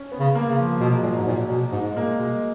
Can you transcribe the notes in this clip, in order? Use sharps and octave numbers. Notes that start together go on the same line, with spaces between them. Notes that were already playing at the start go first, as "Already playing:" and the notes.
Already playing: C#4
B3
C#3
A#3
C#3
F3
B2 F#3
G#3
A#2 F#3
G#2
A#2
B2
G#2 G#3
G#3
A#2 A#3
B2 G#3